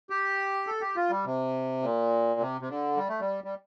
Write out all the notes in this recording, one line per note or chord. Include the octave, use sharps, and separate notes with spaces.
G4
A4
G4
F4
G3
C3
A#2
C3
C3
D3
G3
A3
G3
G3